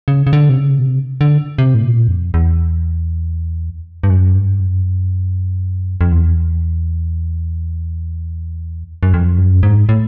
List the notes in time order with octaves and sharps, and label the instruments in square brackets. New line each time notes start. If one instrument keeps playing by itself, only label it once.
[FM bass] C#3
C#3
D3
C3
C#3
B2
C3
D3
C3
A2
A#2
F2
E2
G2
F#2
G2
F#2
F2
E2
F#2
F2
F#2
G#2
A2